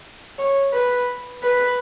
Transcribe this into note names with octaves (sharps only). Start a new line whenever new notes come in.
C#5
B4
B4